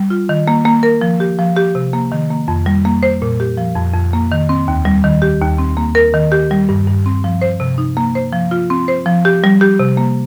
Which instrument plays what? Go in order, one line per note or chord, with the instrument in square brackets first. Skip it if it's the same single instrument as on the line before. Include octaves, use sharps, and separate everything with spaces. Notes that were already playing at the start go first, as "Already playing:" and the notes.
Already playing: [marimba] G3
F4
D#3
A#3
A#3
A#4
F3
G4
F3
G4
C3
A#3
D#3
A#3
F2
G3
A#3
C5
A#2
G4
F3
F2
F2
A#3
D#3
C4
D#2
G3
D#3
G4
D#2
C4
A#3
A#4
D#3
G4
G3
G2
G2
C4
F3
C5
C3
D#4
A#3
C5
F3
F4
C4
C5
F3
G4
G3
G4
C3
A#3